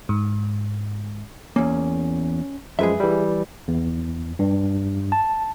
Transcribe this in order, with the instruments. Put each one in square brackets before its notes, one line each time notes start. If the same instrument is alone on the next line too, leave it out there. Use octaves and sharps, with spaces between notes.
[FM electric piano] G#2
[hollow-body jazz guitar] E2 A#3 [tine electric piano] C#4
[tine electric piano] F#2 F3 G#3 [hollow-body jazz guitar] G#4 B4 E5
[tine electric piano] E3 G3
E2
G2
A5